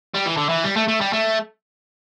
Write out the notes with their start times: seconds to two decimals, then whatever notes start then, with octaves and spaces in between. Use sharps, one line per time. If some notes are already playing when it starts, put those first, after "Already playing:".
0.14 G3
0.25 E3
0.37 D3
0.49 E3
0.64 G3
0.76 A3
0.88 A3
1.01 G3
1.13 A3